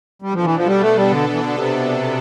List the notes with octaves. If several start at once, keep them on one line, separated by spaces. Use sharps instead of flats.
B2 G3 B3 D4 A4
F3
E3
F3
G3
A3
G3
D3
E3
D3
C3